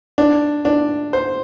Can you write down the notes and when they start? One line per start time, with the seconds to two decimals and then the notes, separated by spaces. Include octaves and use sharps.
0.18 D4
0.65 D4
1.13 C5